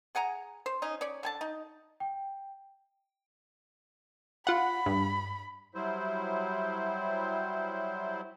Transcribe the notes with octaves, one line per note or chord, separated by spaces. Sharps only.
G#4 F#5 G#5 A#5
C5
C#4 D#4 G#5
C#4 C#5 D5
D3 G#5 A5
D#4
G5
F4 F#5 B5
G2
F#3 G3 E4 C5